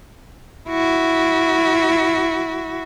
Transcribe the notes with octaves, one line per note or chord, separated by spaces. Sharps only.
E4 F#4